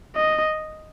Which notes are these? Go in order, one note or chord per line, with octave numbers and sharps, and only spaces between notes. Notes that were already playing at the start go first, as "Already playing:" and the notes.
D#5